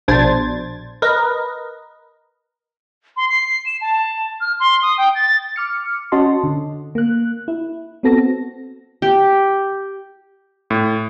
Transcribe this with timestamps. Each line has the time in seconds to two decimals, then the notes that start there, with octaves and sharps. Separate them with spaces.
0.08 A#1 B2 D4 C5 G#6 A6
1.02 A#4 B4 D#5
3.17 C6
3.29 C7
3.66 E7
3.81 A5
4.41 F6
4.60 C6
4.83 D#6
4.98 G5
5.15 A6
5.56 D6 F6 C#7
6.12 C#4 F#4 D#5 A5 C6
6.44 D3
6.95 A#3 F#6
7.48 E4
8.03 B3 C4 F#4 A4 A#6
9.02 G4
10.70 A2